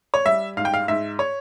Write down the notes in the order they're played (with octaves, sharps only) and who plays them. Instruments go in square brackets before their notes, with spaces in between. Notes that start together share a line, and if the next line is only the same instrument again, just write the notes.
[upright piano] C#5
G3 E5
G#2 F5
G5
F5
G#2 E5
C#5